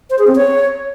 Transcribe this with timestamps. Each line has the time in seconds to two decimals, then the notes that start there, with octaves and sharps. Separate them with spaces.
0.10 C5
0.19 G#4
0.27 C4
0.36 C#5